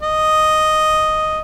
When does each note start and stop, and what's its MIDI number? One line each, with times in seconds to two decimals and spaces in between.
0.02 1.40 75